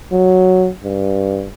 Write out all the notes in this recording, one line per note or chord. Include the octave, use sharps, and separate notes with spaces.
F#3
G2